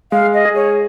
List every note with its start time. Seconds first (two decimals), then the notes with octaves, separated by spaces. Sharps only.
0.12 G#3 F5
0.34 D#5
0.45 G#4
0.55 C#5